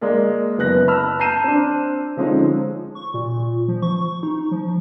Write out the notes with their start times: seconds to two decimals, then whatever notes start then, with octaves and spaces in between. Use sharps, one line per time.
0.01 G#3 A#3 A#4 D5
0.58 F#1 B3 F#6 A#6
0.88 A5 B5 E6 F6
1.19 A5 A#5 G6 C7 D#7 E7
1.44 C4 D4
2.17 D3 F3 G#3 C4 C#4 D#4
2.95 C#6
3.14 A#2
3.68 F3
3.82 C#6
4.23 D#4
4.51 F3